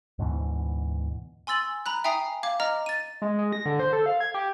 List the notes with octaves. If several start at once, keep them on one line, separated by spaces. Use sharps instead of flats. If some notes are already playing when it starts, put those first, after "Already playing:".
D2 G#2 B2 E3
G#5 C6 E6 A6 F#7
A#5 B5 F#6
E5 G5 G#5 A#5 D#6 C7
F5 D6 G#6
D#5 A#5 F6
A6 D#7
G#3
G#3
A#6
D3
C5
A4
F5
G#6
G4